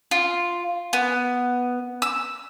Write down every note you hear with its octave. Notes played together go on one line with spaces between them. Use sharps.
F4
B3
E6